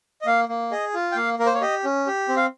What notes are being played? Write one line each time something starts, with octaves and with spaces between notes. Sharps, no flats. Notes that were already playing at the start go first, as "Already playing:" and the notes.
D#5
A#3 F5
A#3
G#4 D#5
F4
G5
A#3 F5
A#3 A#4
C5
C#5
G4 D#5
C#4
G4
C4
F5